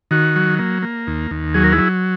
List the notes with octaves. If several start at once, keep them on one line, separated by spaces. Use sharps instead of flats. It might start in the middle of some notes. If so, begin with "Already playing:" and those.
D#3 F#4
F#3
A#3
A#3
D#2
D#2
F#3 G#4
A#4
E4 G#4
F#3